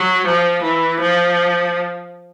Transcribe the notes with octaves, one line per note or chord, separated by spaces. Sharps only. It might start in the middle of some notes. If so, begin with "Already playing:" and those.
Already playing: F#3
F3
E3
F3